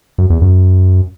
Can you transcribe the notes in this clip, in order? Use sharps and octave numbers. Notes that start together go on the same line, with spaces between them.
F#2
E2
F#2